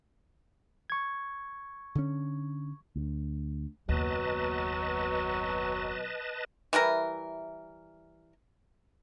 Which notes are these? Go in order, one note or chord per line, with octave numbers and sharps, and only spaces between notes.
C#6 G#6
D3 C#4
D2
F#1 D#2 B2 F#3 B4 D#5 A5
E3 G3 E4 A#4